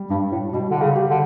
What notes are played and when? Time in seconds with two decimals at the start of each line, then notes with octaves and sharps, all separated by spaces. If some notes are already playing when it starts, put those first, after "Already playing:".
Already playing: G3
0.10 G2 G3
0.32 A2
0.53 B2 G3
0.70 D3
0.81 C#3
0.95 G4
1.10 D3